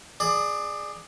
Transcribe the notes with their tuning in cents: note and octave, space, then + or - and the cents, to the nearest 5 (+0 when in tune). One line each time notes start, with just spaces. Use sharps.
G#4 +0 D5 +20